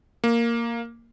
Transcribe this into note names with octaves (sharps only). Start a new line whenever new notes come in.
A#3